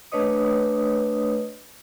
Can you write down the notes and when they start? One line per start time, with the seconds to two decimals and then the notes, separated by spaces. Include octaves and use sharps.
0.12 A3 D4 B4 C#5 D#5 D#6